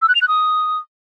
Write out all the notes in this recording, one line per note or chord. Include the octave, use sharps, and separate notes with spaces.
E6
F#6
F7
F#6
D#6